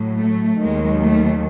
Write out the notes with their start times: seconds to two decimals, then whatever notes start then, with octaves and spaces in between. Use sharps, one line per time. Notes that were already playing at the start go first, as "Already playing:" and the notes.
Already playing: A2 F#3
0.17 A3
0.59 D#2 D#3 F#3 G#3
1.01 A3